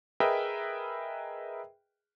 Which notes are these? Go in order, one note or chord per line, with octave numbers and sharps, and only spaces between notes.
G#4 A#4 B4 D#5 E5 G5